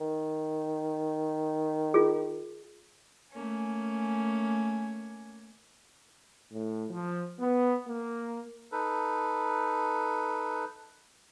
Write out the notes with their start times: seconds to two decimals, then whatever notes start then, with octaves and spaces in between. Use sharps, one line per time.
0.01 D#3
1.94 F4 G#4
3.31 A3 A#3 C#4 G#5
6.52 A2
6.90 F3
7.39 B3
7.88 A#3
8.72 D#4 A4 B4